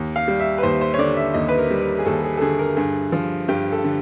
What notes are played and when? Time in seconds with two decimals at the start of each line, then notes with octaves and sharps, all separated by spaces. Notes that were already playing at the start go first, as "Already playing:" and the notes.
Already playing: D#2
0.16 F5
0.28 G3
0.40 E5
0.58 B4
0.63 D#2 C5
0.81 C5
0.94 C#5
0.98 D3 D5
1.17 E5
1.34 D#2 D#5
1.48 B4
1.58 A#4
1.70 G3
1.82 A#4
1.99 G#4
2.06 D#2 A4
2.24 G#4
2.37 A4
2.41 D3 G#4
2.59 A#4
2.76 G2 G#4
3.12 F3
3.48 G2 G4
3.72 A4
3.84 D3